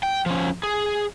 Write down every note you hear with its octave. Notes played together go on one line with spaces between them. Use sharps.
G5
F3 C#4
G#4